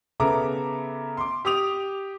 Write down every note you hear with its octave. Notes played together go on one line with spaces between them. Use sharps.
C#3 B3 A4 E5 A#5 D6
C6 D6
G4 D6 D#6 F7